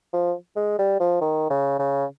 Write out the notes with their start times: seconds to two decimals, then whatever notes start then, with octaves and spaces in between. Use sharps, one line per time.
0.13 F3
0.56 G#3
0.79 G3
1.00 F3
1.21 D#3
1.50 C#3
1.79 C#3